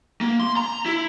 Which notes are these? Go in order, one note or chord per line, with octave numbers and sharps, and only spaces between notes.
A#3
C6
A#5
E4